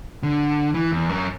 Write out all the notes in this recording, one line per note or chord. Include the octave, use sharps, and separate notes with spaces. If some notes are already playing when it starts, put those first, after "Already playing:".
D3
E3
E2
F#2